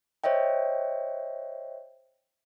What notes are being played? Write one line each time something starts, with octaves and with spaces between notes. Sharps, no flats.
C5 C#5 D#5 E5 G5